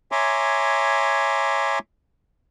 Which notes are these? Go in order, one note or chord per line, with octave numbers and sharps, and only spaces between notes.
C#5 E5 G#5 A#5 C6 D6